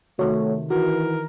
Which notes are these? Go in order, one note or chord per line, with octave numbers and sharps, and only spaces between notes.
C3 D#3 A3 F#4 C#5
D#3 E3 F#4 A#4